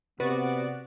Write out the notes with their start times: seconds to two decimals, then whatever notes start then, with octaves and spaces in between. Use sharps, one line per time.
0.20 C3 B3 F#4 B4 D5